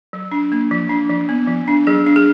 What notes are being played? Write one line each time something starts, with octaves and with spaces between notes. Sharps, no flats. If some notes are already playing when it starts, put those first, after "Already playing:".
F#3
D4
A#3
F3
D4
F3
B3
F3
D4
F#3 G#4
D4
G#4